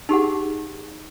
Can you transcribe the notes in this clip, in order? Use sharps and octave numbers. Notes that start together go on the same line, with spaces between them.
D#4 G4 G#4 F#5